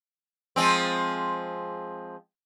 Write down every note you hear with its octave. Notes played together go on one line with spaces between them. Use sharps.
F3 G#3 C4